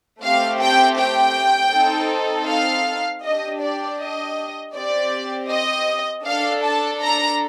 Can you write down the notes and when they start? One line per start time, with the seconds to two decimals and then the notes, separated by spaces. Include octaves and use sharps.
0.23 A3 C4 G4 F5
0.61 G5
0.99 G5
1.73 C4 D#4 A4
2.49 F5
3.24 D4 G4 D#5
3.61 D5
4.00 D#5
4.74 C4 G4 D5
5.50 D#5
6.25 D4 A4 F5
6.64 A5
7.01 A#5